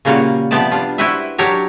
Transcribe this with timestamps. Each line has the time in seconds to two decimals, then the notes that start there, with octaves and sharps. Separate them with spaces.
0.05 A#2 C#3 G3 A#3 F4 F#4
0.51 C3 F3 B3 G4 D5 A5
0.71 G3 D4 F4
0.98 E4 F#4 G4 B4 C5 E5
1.38 F#3 D4 G4 A#4 C#5